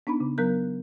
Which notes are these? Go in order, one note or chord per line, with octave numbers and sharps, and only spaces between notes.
B3 D4 D#4 B5
C#3
F#3 B3 A#4 F#6 G6